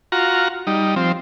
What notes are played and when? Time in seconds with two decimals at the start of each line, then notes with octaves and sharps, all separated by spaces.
0.12 F4 F#4 A#5
0.67 G3 D#4
0.96 F3 C4